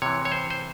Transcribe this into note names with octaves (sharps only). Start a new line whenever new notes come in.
C3 E3 C#5
C#5
C5
C5